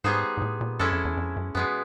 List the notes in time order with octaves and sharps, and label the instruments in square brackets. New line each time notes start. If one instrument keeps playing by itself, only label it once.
[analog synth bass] G#2 [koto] G3 B3 D#4 G#4 C5
[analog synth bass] G#2
A2
A#2
[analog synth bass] F#2 [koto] G#3 C#4 E4 A4
[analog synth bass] F2
E2
F2
F#2
[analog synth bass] F#2 [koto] B2 G#3 B3